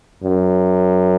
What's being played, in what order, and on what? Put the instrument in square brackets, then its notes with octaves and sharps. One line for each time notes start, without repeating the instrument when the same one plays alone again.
[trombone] F#2